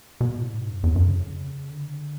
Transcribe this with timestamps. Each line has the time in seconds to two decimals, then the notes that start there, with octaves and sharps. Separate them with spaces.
0.21 B2
0.37 A2
0.53 G#2
0.70 F#2
0.83 E2
0.96 F#2
1.08 C#3
1.71 D3